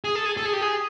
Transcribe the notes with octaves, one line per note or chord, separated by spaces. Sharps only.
G#4
A4
G#4
A4
G#4
G4
G#4